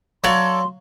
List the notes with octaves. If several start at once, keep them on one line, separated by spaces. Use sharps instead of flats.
F#3 F#4 A4 C#5 D5 F5 C6